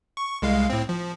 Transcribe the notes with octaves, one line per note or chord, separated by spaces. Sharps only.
C#6
C2 G#3 F5
A2 C4
F3